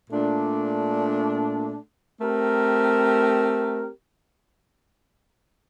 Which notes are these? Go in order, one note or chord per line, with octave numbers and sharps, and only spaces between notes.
A#2 A3 D4
A3 C4 G4 A#4